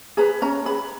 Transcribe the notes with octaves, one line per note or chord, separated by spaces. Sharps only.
G#4 B4 A#5
C#4 A#5
G#4 B4 B5